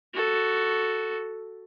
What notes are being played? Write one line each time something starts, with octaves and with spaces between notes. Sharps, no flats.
F#4 A4